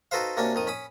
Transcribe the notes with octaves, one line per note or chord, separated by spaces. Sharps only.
D#4 F#4 A4 B4 C5 F5
C3 A#3 C#4 D4 F#4
F2 D#3 D#6
C#4 B5 D#6